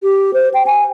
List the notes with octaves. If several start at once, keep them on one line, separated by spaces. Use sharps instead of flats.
G4
C5
G5
G#5